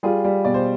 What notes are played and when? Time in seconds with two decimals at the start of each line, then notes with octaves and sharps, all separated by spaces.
0.03 G3 F4 G#4
0.24 G3
0.45 B2 D5
0.54 C5